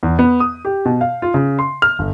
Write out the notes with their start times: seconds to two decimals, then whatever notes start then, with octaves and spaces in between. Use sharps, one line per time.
0.03 E2
0.19 B3
0.40 D#6
0.65 G4
0.85 B2
1.01 F5
1.22 F4
1.34 C#3
1.59 C6
1.82 F6
1.99 G1